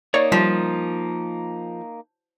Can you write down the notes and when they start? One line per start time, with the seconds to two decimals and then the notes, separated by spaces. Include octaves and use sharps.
0.14 A#3 D#4 C#5 D5
0.32 F3 G3